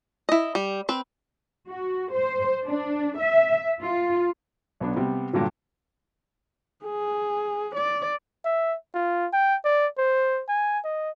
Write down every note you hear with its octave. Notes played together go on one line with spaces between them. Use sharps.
E4 D#5
G3
C4 B4
F#4
C5
D4
E5
F4
B1 B3 D4
C3 G3 B3
G2 A#2 D3 F#3
G#4
D5
E5
F4
G5
D5
C5
G#5
D#5